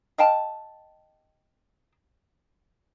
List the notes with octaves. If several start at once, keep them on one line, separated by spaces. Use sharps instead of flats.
D#5 F5 G5 A5